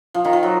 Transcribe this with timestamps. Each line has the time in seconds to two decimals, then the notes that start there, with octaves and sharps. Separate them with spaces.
0.14 F3
0.25 D#3
0.33 F3
0.43 F#3